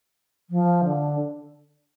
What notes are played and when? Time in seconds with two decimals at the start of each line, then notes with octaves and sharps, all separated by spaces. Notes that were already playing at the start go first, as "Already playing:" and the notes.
0.50 F3
0.85 D3